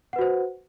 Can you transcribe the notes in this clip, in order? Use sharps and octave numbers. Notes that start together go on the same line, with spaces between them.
F#4 B4 C5 F#5